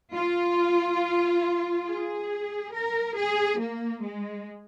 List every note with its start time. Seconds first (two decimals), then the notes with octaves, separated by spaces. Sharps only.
0.13 F4
1.87 G#4
2.73 A#4
3.16 G#4
3.59 A#3
4.02 G#3